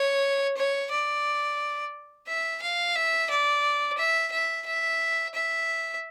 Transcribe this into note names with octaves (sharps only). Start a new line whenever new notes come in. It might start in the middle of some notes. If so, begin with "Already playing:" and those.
Already playing: C#5
C#5
D5
E5
F5
E5
D5
E5
E5
E5
E5